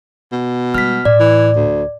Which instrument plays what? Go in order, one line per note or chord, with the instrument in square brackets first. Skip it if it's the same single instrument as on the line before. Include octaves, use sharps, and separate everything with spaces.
[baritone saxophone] B2
[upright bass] G3 G#3 [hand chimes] F6 B6
[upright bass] A2 [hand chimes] D5
[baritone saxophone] E3
D2